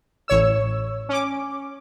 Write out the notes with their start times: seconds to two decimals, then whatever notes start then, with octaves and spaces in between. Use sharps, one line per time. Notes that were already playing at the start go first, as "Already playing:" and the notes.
0.28 A1 C#5 E6
1.09 C#4 D6